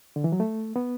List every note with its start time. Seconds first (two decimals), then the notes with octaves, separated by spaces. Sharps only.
0.16 D3
0.24 E3
0.32 F#3
0.40 A3
0.76 B3